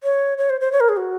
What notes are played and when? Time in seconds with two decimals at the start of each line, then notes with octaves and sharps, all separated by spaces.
0.03 C#5
0.38 C#5
0.50 C5
0.61 C5
0.72 C#5
0.80 A#4
0.89 G#4
0.97 F#4